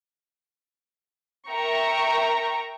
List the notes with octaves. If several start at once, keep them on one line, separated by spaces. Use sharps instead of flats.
A#4 E5 G5 A#5 C#6